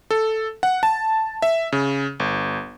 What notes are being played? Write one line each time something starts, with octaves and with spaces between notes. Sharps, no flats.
A4
F#5
A5
E5
C#3
G1